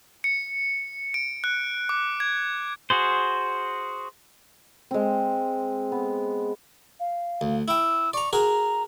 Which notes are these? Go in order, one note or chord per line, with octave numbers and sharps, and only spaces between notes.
C#7
D7
F#6
D6
G#6
F#4 G#4 C5
G#3 C4
B3
F5
D2
E4 G5 E6
D5 A#5 C#6
F#4 G#4 A#4 A#5